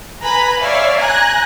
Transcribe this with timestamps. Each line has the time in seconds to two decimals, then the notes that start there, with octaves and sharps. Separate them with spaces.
0.22 B4 G#5 A#5 B5
0.61 C#5 D5 E5 F5 G#5
0.99 G#5 A#5 F#6 G#6 A#6